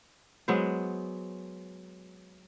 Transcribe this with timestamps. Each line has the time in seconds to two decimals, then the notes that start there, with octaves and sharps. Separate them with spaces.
0.48 F#3 G#3 B3 C5